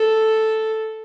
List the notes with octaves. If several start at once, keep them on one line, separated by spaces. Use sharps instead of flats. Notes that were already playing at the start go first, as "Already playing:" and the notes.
Already playing: A4